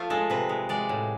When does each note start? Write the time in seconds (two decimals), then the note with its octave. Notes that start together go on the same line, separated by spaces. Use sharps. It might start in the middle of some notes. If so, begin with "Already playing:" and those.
Already playing: F3 A3 F4
0.10 G#3 A4
0.30 C3 B4
0.49 G#3
0.69 G#3 D5
0.89 A2